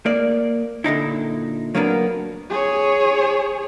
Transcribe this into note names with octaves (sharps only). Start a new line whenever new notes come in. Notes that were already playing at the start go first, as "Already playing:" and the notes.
A#3 D5
A#2 D3 D#4 E4
F#3 A#3 B3 D4 A#4
G#4 C#5